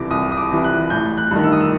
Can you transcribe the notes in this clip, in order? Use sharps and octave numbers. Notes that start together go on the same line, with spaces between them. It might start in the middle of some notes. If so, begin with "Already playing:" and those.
Already playing: C2 C3 E3 D6
C2 D#6
D#6
D6
C3 E3
F#6
A1 G6
F#6
G2 D#3
E6
D#6
E6